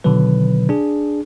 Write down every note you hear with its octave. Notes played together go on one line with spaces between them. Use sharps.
B2 D3 D#3 F#3 B4
D4 G#4